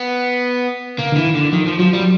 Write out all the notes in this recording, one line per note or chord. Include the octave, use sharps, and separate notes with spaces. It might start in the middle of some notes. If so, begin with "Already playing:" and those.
Already playing: B3
C#3 A#3
D3
E3
D#3
D3
D#3 F3
F3
F3 F#3
G3
F#3